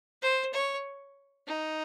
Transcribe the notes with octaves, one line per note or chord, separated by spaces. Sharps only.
C5
C#5
D#4